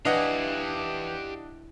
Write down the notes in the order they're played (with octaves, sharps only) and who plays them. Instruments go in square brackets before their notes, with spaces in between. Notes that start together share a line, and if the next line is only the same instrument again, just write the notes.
[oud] E3 [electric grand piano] D4 D#5 F#5 [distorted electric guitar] G4 F5